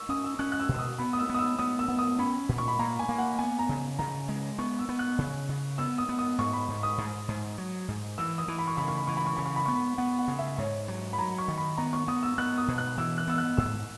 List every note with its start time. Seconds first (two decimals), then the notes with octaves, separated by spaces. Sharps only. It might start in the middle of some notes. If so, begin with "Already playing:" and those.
Already playing: C#6 E6
0.09 C#4 D#6
0.24 E6
0.39 C#4 F#6
0.52 F#6
0.60 E6
0.69 B2
0.75 E6
0.79 D#6
0.99 B3 B5
1.13 D#6
1.19 E6
1.29 B3 D#6
1.39 E6
1.59 B3 D#6
1.79 E6
1.88 B3
1.99 D#6
2.19 C#4 B5
2.49 A#2
2.58 C#6
2.68 B5
2.79 A#3 A#5
2.99 G#5
3.09 A#3
3.18 F#5
3.39 B3 G#5
3.59 A#5
3.69 C#3
3.99 C#3 A#5
4.29 G#3
4.59 B3 C#6
4.79 E6
4.89 B3
4.99 F#6
5.18 C#3
5.49 C#3
5.78 B3 E6
5.98 D#6
6.09 B3
6.19 D#6
6.38 G#2 C#6
6.53 B5
6.68 G#2
6.83 D#6
6.98 G#2
7.28 G#2
7.58 F#3
7.88 G#2
8.18 E3 E6
8.38 D#6
8.48 E3
8.59 B5
8.67 C#6
8.77 C#3 B5
8.88 C#6
8.97 B5
9.07 E3 C#6
9.17 B5
9.27 C#6
9.37 C#3 B5
9.46 C#6
9.56 B5
9.66 B3 C#6
9.75 B5
9.98 B3 F#5
10.19 F#5
10.28 C#3
10.39 E5
10.58 G#2 C#5
10.88 F#3
11.13 B5
11.18 F#3 A#5
11.38 C#6
11.48 D#3
11.58 B5
11.77 B3 A#5
11.93 C#6
12.08 B3 D#6
12.23 E6
12.38 B3 F#6
12.58 D#6
12.68 B2
12.78 F#6
12.98 E3 E6
13.18 F#6
13.28 B3 E6
13.38 F#6
13.57 G#2 E6